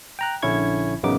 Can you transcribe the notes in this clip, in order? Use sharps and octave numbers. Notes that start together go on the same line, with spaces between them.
G5 A#5 F#6
A#1 D3 C#4 E4 C#6 G#6
A1 F#2 C#3 B3 D#4 D6